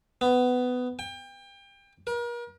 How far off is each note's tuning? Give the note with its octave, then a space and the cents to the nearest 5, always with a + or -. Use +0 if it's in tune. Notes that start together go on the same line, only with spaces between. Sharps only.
B3 +15
G5 +30
A#4 +40